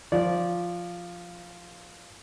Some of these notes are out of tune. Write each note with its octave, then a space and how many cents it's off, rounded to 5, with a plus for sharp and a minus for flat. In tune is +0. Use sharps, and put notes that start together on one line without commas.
F3 +0 D5 -15